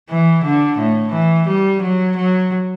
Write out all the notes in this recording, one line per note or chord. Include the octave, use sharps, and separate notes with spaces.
E3
D3
A2
E3
G3
F#3
F#3